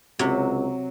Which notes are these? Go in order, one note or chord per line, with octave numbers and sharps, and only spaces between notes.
C#2 C3 F#3